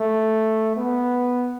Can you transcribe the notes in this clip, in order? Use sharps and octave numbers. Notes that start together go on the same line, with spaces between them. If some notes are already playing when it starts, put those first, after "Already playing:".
Already playing: A3
B3